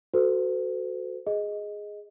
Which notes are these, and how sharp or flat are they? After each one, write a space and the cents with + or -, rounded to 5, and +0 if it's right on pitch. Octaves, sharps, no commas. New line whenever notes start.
F#4 +0 A4 +0 C5 -45
G#4 +0 D#5 +5